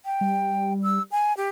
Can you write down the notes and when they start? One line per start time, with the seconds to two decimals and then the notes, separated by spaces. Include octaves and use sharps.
0.05 G5
0.21 G3
0.83 E6
1.11 G#5
1.37 G4